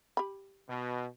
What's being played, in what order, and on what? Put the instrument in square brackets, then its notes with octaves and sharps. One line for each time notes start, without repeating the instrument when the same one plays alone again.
[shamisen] G4 B5
[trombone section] B2